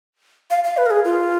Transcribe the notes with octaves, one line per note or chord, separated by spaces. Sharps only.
F5
F5
B4
A#4
G#4
F4